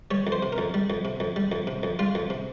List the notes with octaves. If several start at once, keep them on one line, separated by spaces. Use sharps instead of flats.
G3 C#5
F2
C5
C3
A#4
F2
G3
F2
C3
F2
G3
F2
C3
F2
G3 F4
F2
C3